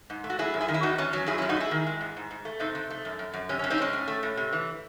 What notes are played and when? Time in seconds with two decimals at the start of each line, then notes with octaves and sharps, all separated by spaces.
0.10 G#2
0.24 A3
0.30 F#4
0.39 F#3 E4 G#4
0.54 F#2
0.61 E4 G#4
0.68 D#3
0.74 E4
0.83 E2 D#4 F#4
0.98 E2 C#4
1.13 F#3 C#4
1.26 F#2 E4 G#4
1.38 C#4 E4
1.42 F#2
1.49 D#4 F#4
1.56 A3 E4 G#4
1.71 D#3
1.86 G#3
2.01 G#2
2.16 G#2
2.31 G#2
2.45 A3
2.60 C3 C4 D#4
2.75 C3
2.90 A3
3.05 F#2
3.19 F#2
3.33 F#2
3.49 C3 C#4
3.59 C#4
3.64 C3
3.70 C4 D#4
3.78 G#3 C#4
3.93 A2
4.08 A3
4.23 A2
4.37 C3
4.53 E3